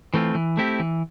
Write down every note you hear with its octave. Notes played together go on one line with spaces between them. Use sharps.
E3 A3 C4 F4
E3
A3 C4 E4 G4
E3